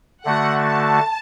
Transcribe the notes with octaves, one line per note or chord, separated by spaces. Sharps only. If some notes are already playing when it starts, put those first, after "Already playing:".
D3 A3 F#4 F#5
A5